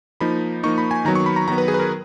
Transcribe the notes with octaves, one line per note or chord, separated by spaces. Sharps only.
F3 A#3 D#4 B5
F3 A#3 D#4 C#6
B5
G#5
D#3 F#3 B3 A#5
C#6
B5
A#5
D#3 F#3 B3 A#5
B4
G#4
B4
A#4